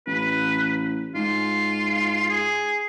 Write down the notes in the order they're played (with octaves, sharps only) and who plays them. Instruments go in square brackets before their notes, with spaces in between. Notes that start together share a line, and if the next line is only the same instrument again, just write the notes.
[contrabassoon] A1 [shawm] B4
[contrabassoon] G#2 [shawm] F4
[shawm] G#4